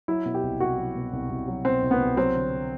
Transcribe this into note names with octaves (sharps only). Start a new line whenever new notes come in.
F#3 E4
B2
G4
C2
C2 F#4
F#3
B2
C2
C2
F#3
B2 C4
C2
B3
C2
F#3 C4
D3